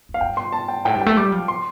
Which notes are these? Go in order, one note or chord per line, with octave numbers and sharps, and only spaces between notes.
F2
F5
G2 G5
C6
A5
G5
A2 G5
G2
G5
A3
G3 D6
F3
C6